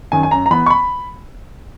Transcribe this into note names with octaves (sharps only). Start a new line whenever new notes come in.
F#2 D#3 G#5
G#5
F#2 A#5
A#5
E3 B3 B5
C#6
B5